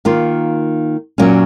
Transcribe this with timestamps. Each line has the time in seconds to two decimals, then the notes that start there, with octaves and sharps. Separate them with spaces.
0.05 D#3 A#3 F4
1.18 A#2 F#3 A#3 C#4